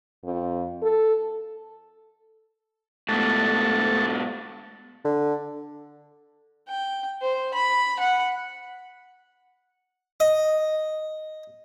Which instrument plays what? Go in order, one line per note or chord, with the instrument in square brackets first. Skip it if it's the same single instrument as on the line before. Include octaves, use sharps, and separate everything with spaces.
[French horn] F2
A4
[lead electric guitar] G#2 B2 [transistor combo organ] A3 A4
[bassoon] D3
[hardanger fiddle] G5
C5
B5
F#5
[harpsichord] D#5